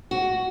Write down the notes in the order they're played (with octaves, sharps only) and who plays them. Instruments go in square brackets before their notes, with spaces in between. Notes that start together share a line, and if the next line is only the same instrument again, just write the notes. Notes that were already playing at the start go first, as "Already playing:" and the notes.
[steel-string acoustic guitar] F#4